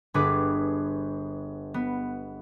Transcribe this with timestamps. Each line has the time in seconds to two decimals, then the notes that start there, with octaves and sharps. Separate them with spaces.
0.14 G1 G#4 B4 D6
1.74 B3